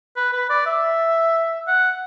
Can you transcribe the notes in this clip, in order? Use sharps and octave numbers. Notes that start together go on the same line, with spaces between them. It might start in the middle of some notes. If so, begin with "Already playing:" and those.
B4
B4
D5
E5
F#5